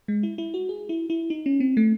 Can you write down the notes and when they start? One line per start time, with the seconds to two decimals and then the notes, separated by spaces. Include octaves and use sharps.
0.08 G#3
0.23 E4
0.38 E4
0.54 F#4
0.69 G#4
0.89 E4
1.10 E4
1.30 D#4
1.46 C#4
1.60 C4
1.77 A3